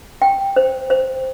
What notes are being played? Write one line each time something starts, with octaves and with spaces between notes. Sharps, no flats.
G5
C5
C5